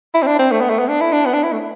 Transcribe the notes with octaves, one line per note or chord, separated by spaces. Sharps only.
E4
C4
D4
C4
A3
B3
A3
B3
D4
E4
D4
B3
D4
E4
A3